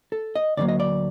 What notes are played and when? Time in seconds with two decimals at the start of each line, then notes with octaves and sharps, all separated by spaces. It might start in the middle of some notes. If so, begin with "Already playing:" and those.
0.12 A4
0.35 D#5
0.57 D2 D3 F#3 A#3 D5
0.68 D#5
0.80 D5